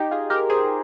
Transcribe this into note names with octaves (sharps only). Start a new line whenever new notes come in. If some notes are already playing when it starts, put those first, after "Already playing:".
Already playing: D#4 G4
F4 G#4
G4 A#4
G#4 C5